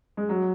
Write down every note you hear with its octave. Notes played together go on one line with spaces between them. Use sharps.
G#3
F#3